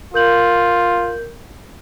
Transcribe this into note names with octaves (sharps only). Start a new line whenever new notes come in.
F4 A#4 G6 F#7